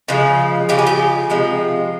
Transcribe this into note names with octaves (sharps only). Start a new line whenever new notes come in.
C#3 F3 G#3
C#3 F3 G#3 G4
G#4
G4
C3 F3 G#3